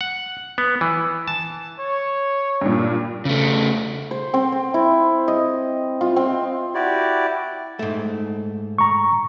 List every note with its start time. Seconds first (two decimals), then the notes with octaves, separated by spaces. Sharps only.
0.01 F#5
0.58 B3
0.81 E3
1.28 A5
1.80 C#5
2.61 G2 A#2
3.25 C#3 A3
4.11 C5
4.34 C4
4.52 C4
4.74 E4
5.28 D#5
6.01 F4
6.16 C4
6.74 E4 F#4 G4 D5
7.79 G#2 A3
8.78 A#5 C#6